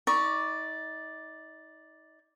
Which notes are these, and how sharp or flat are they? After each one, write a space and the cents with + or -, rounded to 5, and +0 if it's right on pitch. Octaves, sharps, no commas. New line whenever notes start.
D#4 +35 D5 +0 C#6 +0